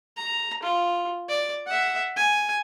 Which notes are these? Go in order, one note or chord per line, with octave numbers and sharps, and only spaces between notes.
A#5
F4
D5
E5 F#5
G#5